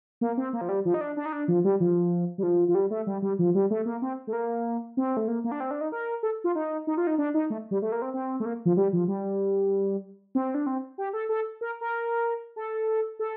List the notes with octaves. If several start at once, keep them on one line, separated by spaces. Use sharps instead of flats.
A#3
C4
A#3
F3
G3
F3
D#4
D4
D4
D#4
D4
F3
G3
F3
G3
F3
F3
G3
A3
G3
G3
F3
G3
A3
A#3
C4
A3
A#3
C4
A3
A#3
A#3
D4
C4
D4
D#4
A#4
A4
F4
D#4
D#4
F4
D#4
D4
D#4
A3
G3
A3
A#3
C4
C4
A3
A#3
F3
G3
F3
G3
C4
D4
C4
G4
A4
A4
A#4
A#4
A4
A4